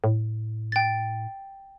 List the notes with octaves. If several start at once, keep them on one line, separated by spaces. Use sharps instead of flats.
A2
G5 A6